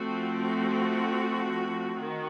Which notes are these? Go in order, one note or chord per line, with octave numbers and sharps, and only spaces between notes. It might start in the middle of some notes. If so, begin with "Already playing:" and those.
Already playing: F3 A3 C4 F#4
F#4
D#3